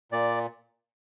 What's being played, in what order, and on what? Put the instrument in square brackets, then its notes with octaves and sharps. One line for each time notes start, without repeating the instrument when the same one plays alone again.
[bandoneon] A#2 D5